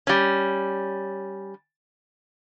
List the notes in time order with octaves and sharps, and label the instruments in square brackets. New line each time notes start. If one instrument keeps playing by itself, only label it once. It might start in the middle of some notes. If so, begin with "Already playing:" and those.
[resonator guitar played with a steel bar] G3 C#4